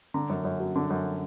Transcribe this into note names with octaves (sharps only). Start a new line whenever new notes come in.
D3 A#5
F#2
F#2
F#3
D3
F#2